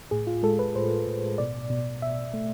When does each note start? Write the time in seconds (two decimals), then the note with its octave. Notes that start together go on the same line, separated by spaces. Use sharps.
0.11 A2 G#4
0.27 F4
0.43 G#3 A4
0.59 B4
0.75 A2 C5
1.07 A2
1.38 B2 D5
1.70 B2
2.02 B2 E5
2.34 A3